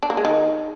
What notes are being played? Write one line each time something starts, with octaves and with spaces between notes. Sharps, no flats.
D4
A#3
G#3
D#3